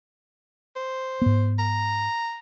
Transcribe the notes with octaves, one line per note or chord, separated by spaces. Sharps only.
C5
G#2 B3
A#5